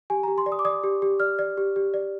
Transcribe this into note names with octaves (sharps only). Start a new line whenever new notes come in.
G4 G#5
G4 A#5
C6
D5
D#6
D6
D5 D#6
G4
G4
D5 F6
D5
G4
G4
D5